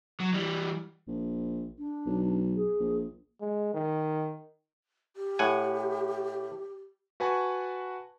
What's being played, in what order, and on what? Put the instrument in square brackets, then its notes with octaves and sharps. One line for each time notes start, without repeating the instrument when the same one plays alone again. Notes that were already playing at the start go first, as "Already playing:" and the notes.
[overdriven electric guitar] F#3
E3 G3
[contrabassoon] A#1
[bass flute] D4
[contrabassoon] B1
[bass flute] G#4
[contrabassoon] A#1
[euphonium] G#3
D#3
[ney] G4
[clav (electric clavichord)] A2 F#5 G#5
[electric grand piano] F#4 B4 F#5 G#5 A5 C#6